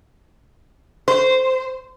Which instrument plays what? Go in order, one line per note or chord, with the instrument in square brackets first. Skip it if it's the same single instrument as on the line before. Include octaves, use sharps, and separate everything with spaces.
[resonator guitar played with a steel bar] C5